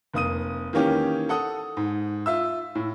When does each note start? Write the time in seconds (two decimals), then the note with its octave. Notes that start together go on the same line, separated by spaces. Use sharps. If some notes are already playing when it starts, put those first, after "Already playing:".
0.13 F1 A#3 D#6 D#7
0.73 D#3 E3 A#3 C#4 G4
1.29 A4 F#5 D#6
1.77 G#2
2.26 F4 E5 E6
2.75 A2